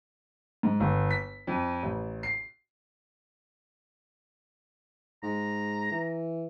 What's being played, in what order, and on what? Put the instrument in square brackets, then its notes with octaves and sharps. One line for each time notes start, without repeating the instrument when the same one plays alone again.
[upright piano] G#2
G1
B6
F2
A1
C7
[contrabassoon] G#2 [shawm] A#5
[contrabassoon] E3